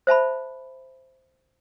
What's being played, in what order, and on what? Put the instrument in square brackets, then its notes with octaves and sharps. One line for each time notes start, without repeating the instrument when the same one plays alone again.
[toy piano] C5 E5 A5 B5